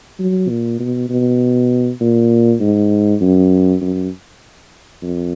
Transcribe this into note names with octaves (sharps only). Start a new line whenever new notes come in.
F#3
A#2
B2
B2
A#2
G#2
F#2
F#2
F2